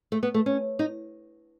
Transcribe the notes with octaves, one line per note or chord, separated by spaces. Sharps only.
A3
B3
A3
C#4
D#4